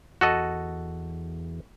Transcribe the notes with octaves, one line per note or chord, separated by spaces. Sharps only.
E2 F#4 A4 D#5